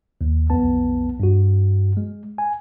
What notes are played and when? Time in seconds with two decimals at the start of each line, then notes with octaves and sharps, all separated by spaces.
0.21 D#2
0.50 B1 F2 B3 A5
1.20 G2 F#4
1.97 G#3
2.38 G#5